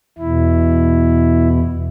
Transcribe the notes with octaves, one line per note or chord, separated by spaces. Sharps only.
E2 B2 E4